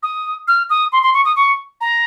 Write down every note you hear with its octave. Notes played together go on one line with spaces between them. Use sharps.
D#6
F6
D#6
C6
C6
C#6
D#6
C#6
A#5